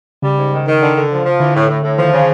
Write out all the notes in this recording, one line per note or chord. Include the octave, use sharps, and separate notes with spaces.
C#3 G3
G#2
D#3
D#3
D3
D3
F3
F3
D3 E3
A2
A2
A2
D#3 F3
C#3